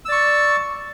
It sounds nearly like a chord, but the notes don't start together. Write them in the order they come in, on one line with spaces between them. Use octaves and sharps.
E6 D5 C#6